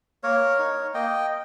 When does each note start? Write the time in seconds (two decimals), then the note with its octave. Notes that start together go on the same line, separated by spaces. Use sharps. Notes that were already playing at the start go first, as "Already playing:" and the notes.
0.23 A#3 A#4 C#5
0.59 D#4
0.94 A#3 D#5 G5